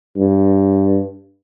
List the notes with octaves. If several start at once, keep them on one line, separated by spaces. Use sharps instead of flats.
G2